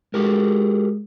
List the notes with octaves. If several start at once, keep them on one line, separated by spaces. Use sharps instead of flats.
G#3 F#4 G4 A#4